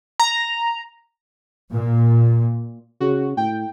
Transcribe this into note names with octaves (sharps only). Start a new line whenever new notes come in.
A#5
A#2
C#3 F#4
A2 G5